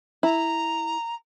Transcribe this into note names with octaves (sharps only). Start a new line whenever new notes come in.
E4 A#5